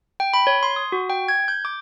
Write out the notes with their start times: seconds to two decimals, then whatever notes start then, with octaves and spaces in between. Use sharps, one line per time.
0.20 G5
0.34 B5
0.47 C#5
0.63 C6
0.76 D#6
0.92 F#4
1.10 G5
1.28 G#6
1.48 G6
1.65 D6